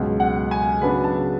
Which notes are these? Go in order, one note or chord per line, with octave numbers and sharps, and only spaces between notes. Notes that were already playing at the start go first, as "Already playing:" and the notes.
Already playing: C#2 B2 F#3
F#5
G#5
C#3 F#3 B3 D4 B5
A5